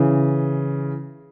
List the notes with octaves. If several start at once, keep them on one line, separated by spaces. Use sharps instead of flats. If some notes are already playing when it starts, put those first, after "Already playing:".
Already playing: C#3 E3